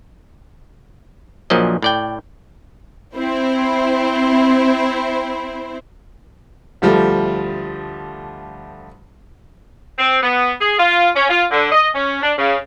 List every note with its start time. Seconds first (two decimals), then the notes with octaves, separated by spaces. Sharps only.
1.50 A#1 A#2 F3 F#3 D#5
1.82 A2 D5 G5
3.16 C4 E4 C5
6.82 D2 F3 G3 A3
9.99 C4
10.22 B3
10.60 G#4
10.79 F4
11.16 C#4
11.30 F4
11.51 D3
11.72 D#5
11.95 C#4
12.23 D4
12.38 C#3